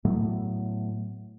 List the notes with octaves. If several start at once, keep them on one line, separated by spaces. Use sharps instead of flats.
A2 F#3 A3 B3